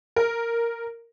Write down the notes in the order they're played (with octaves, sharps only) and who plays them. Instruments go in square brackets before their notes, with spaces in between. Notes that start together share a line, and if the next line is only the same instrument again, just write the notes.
[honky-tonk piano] A#4